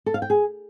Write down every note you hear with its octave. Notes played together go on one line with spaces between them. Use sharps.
A4
F5
G5
G#4